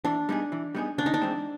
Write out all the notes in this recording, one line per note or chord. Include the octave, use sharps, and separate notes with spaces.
E3 D4
G3 B3 D#4 G#4
E3
G3 B3 D#4 G#4
C#3 D4
D#4
D4
E3 G#3 C4